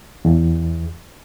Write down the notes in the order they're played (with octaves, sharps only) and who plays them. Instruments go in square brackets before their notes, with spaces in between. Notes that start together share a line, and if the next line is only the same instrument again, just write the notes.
[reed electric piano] E2